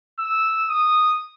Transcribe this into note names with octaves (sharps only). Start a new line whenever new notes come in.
E6
D#6